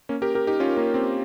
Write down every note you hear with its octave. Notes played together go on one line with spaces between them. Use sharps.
A#3 C#4
G4 A#4
G4 A#4
D#4 G4
C#4 F4
A#3 C#4
C4